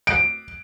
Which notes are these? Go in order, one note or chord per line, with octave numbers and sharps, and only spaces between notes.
D7